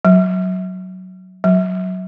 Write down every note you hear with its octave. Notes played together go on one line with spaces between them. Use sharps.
F#3
F#3